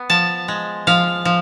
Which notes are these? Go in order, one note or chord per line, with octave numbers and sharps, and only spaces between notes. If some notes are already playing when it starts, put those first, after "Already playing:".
Already playing: B3
F3 A5
G#3
F3 F5
F3